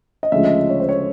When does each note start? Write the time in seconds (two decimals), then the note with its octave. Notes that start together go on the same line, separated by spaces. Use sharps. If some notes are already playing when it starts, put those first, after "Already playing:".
0.23 D#5
0.32 D2 C#3 F3 G#3 E5
0.44 D#5
0.70 C#5
0.80 C5
0.89 C#5